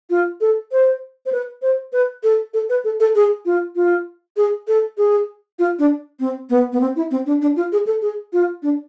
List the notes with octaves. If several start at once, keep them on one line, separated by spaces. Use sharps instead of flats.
F4
A4
C5
C5
B4
C5
B4
A4
A4
B4
A4
A4
G#4
F4
F4
G#4
A4
G#4
F4
D4
C4
B3
B3
C4
E4
C4
D4
D4
F4
G#4
A4
G#4
F4
D4